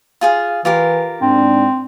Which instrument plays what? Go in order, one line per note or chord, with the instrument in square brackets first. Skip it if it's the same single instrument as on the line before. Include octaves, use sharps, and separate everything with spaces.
[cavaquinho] F4 G#4 F5
[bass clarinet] E3 [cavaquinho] F4 G4 A#4
[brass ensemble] G#2 D4 [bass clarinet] C4